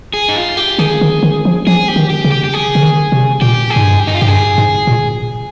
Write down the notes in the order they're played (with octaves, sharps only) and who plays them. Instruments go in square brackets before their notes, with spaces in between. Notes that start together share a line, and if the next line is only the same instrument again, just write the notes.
[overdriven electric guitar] G#4
D#4
F4
G4
[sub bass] D#3 [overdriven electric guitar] G#4
[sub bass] D#3
D#3
F3
[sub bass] F3 [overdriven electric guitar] G#4
[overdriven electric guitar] G4
[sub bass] D#3
[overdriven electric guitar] G4
[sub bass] C#3
[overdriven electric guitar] G4
G4
G#4
[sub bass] C#3
D#3
C3
[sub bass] A#2 [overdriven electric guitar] G4
[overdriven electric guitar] G#4
[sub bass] G#2
G2
[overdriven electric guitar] G4
D#4
F4
[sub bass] G#2 [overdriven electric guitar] G4
[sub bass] G2 [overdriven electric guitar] G#4
[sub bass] G#2
A#2